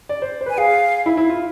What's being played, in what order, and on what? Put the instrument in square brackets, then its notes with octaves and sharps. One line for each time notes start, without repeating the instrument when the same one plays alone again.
[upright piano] D5
C5
C5
[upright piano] B4 [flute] G#5
[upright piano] G#4 [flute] F5
[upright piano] E4
E4
F4